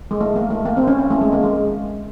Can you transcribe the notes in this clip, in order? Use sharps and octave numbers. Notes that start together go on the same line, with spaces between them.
G#3
A3
A#3
A3
A#3
C4
C#4
C#4
A3
G#3
A#3
G#3